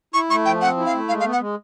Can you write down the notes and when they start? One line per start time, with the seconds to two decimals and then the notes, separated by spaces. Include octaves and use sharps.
0.14 E4 C#6
0.30 A3 C#6
0.45 F3 G5
0.61 C4 F#5
0.77 E4
0.85 F5
0.93 A3
1.09 G#3 F5
1.20 F5
1.25 B3
1.32 F#5
1.40 G#3